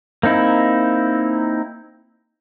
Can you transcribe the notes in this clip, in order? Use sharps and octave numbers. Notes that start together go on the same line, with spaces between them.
A#3 C4 D#4 E4